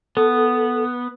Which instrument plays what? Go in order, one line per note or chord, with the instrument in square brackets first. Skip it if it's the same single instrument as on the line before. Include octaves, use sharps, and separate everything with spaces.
[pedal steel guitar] B3 [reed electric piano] A4